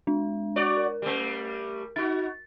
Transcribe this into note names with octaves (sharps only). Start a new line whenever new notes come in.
G#3 D4
F#4 C#5 D5
A#4
G3 A3
D#4 F#4 A6